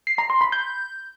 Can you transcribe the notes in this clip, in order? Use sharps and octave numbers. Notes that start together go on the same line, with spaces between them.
C7
A#5
C6
B5
G6